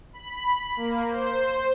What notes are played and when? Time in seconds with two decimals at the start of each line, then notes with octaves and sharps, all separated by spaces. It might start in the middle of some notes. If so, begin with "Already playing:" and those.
0.13 B5
0.77 A#3
1.08 C5